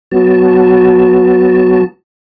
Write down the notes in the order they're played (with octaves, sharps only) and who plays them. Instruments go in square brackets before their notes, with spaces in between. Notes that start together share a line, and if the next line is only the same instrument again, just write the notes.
[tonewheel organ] F#3 B3 F#4 A5